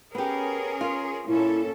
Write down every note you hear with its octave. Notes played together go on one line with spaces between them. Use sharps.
B3 C#4 G4 G#4 A#4
F4
A#2 C#4 E4 A4